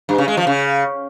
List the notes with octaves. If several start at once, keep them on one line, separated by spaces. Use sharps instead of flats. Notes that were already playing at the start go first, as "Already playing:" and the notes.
G2
C#3
G#3
F3
C#3